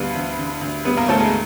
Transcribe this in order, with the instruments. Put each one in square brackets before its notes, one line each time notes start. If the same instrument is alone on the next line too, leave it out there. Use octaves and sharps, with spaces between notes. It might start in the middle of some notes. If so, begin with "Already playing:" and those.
Already playing: [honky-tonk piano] D2 D3 G3 B3 B4 F5
D2
D3
D2
G3 B3 B4
A#3 A#4
D2 A3 A4
G#3 G#4